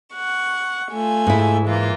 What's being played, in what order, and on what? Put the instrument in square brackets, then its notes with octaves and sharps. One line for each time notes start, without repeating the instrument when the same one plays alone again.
[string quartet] F#5 C#6
A3 F4 G#5
[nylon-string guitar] G#2 E4
[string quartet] E3 A#3 F4